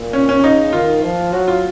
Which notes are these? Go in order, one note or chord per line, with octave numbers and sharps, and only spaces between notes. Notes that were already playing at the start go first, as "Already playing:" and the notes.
Already playing: A#2
C#4
C#4
C#3 D#4
D#3 F4
F3
F#3 F#4
F4